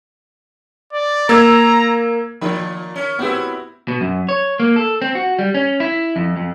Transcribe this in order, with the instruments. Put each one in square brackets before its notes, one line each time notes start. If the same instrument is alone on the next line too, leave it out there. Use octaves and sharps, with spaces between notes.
[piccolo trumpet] D5
[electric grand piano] A#3 E6 G#6 [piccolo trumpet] A#5
[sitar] A#2 F3 [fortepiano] D#3 B5
[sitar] C#4
[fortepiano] B3 C4 G4 [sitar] E4 F#4
[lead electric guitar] B2
F#2
C#5
A#3
A4
C4
F#4
G3
C#4
E4
F2
F2